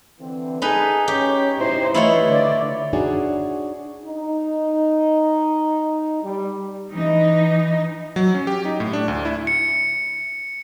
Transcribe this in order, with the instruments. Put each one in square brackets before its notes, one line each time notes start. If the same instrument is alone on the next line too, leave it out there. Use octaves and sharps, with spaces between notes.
[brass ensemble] D3 E3 C4
[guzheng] D#4 B4 [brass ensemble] G#4 A4 G#5
[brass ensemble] C#4 C#5 [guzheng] G4
[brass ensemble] C2 B2 [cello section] D#4 E4 C5
[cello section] E3 A3 [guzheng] E4 F4 C#5 [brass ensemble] B4 D#5
[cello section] D3 D5
[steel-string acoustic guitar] D4 D#4 F#4 G#4 C#5
[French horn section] D#4
G3
[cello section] E3 D#4
[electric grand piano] F#3
C#4
G4
D#4
A2
D4
D2
E4
[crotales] C#7